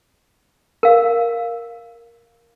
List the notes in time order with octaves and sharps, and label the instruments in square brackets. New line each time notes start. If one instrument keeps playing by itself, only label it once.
[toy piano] A#4 F5